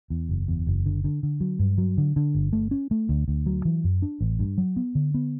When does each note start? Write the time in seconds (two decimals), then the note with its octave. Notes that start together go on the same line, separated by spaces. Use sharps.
0.10 E2
0.29 F#1
0.48 E2
0.67 F#1
0.86 D3
1.04 D3
1.23 D3
1.41 F#3
1.59 G2
1.78 F#3
1.98 D3
2.16 D3
2.35 G1
2.53 A3
2.71 C#4
2.91 A3
3.09 D2
3.28 D2
3.46 F#3
3.65 E3
3.84 F#2
4.02 D4
4.21 A1
4.39 G2
4.58 F#3
4.76 B3
4.95 D3
5.14 B3